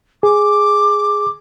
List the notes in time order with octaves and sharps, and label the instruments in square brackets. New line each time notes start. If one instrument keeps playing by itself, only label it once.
[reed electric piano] G#4 [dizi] D6